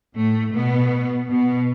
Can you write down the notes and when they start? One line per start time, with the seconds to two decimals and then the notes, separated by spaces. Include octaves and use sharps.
0.16 A2 A3
0.54 B2 B3
1.30 B2 B3